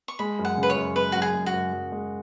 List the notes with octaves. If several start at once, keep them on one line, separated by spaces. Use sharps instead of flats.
C#6
G#3 B5
F#2
F#5
C#3 B4
C#5
F#2
G#3 B4
F#2 F#4
G#4
G#3
F#4
F#2
F#2
G#3